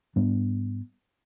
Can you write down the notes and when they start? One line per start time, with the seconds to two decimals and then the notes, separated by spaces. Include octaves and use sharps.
0.16 G#2 G3 B3 D4